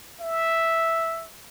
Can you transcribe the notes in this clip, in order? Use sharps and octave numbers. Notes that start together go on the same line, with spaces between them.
E5